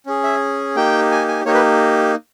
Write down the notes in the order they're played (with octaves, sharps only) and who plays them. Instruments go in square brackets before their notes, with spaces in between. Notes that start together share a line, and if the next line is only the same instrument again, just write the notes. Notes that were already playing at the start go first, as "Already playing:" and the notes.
[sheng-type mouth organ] C#4 G#4
E5
A#3 D#4 G4 G5
G#5
G#5
A#3 D#4 G4 C#5
B4